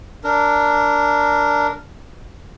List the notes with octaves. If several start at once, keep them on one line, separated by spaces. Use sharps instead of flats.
D4 A#4